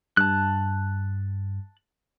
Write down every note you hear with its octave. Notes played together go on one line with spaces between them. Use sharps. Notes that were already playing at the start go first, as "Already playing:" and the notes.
G2 A5 F#6